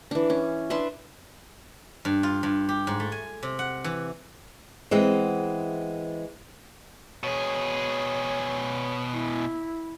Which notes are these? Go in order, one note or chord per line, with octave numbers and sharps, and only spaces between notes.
E3 D4
C#4
D4 B4 E5 C6
G2
F4
G2
G4
G#2
A3
G#5
C3
F#5
E3
E3 G#3 B3 C4
B2 G#4 C#5
E4